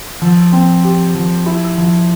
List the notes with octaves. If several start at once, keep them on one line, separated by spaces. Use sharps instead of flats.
F3
C4
G4
F3
E4
F3